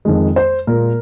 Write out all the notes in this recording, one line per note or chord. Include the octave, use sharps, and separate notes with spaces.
F2 D#3 G#3
C5
A#2 G#3 A#4